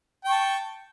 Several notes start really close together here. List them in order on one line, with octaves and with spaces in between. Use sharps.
G5 C#6 A5